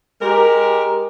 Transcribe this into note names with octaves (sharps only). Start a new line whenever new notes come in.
G#3 G4 A#4